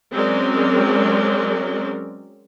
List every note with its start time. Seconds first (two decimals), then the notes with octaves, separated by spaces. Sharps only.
0.12 F#3 G#3 C4 C#4 A#4 D5